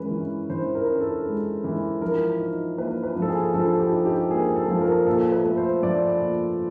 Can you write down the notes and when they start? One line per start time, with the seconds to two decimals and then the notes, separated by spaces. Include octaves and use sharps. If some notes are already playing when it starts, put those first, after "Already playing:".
Already playing: E3 G#3 C#4 A#4 B4
0.11 E3
0.50 E3 C5
0.75 A#4
0.88 C#4
1.01 A4
1.26 G#3
1.64 E3
2.02 F3 A#4
2.40 D#4
2.78 A#3 B4
3.03 B4
3.16 F3
3.22 A4
3.29 G#4
3.54 F3 A4
3.80 G4
3.92 D#4
4.05 G4
4.30 A#3 G#4
4.56 A4
4.68 F3
4.81 A#4
5.07 A#2 A4
5.32 B4
5.45 A3
5.57 C5
5.83 F3 D5
6.21 A#2